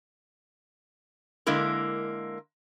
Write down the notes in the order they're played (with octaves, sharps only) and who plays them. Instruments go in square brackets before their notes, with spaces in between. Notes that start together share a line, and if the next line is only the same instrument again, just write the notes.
[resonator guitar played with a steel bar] D3 G#3 A#3 E4 A#4